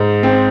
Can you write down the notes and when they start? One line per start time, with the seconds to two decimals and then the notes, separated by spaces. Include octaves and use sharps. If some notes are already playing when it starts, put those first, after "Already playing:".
Already playing: G#2
0.23 C4